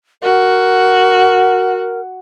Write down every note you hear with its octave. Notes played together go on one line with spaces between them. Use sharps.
F#4 A#4